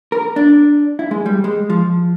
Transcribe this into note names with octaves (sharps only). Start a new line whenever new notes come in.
A#4
D4
E4
G#3
G3
G#3
F3